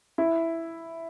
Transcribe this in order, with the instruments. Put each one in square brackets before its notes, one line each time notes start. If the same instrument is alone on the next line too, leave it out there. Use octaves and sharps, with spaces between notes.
[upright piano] E4